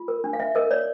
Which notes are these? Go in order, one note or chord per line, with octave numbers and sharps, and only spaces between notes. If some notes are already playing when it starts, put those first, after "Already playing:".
Already playing: F4
A#4
D4
F5
D4 E5
A#4 D#5
C#5 D5